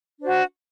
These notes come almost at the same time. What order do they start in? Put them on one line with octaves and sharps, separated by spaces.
D4 C5 F#4